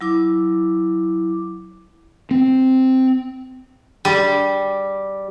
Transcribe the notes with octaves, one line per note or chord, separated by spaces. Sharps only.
F#3 E4 D6
C4
G3